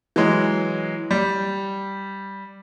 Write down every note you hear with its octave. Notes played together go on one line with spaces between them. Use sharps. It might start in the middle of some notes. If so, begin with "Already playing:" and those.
E3 F#3 G#3
G3